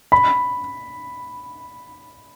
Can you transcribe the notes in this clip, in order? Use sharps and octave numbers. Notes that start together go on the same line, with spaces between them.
B5